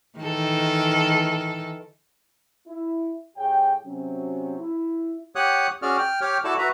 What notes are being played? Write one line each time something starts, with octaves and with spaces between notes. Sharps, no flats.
D#3 E3 A4
E4
A2 G4 G#4 C#5 G5
C3 F#3 C4 C#4
E4
G4 C#5 F#5 D#6 F#6
C#4 F#4 G#4 D5 F6
G5 F6
G4 C#5 G5 F6
E4 F#4 A4 D5 A5
F#4 B4 E5 A#5